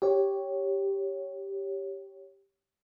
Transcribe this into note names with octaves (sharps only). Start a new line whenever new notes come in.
G4 C#5